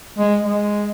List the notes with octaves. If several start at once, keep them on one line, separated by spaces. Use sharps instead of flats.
G#3
G#3